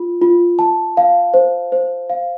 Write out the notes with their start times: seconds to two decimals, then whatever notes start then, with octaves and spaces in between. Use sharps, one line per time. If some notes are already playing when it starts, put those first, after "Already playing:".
Already playing: F4
0.21 F4
0.59 A5
0.97 F5
1.34 C5
1.72 C5
2.10 F5